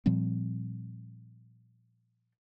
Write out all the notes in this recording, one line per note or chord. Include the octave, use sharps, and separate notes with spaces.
A#2 F3 G3 C4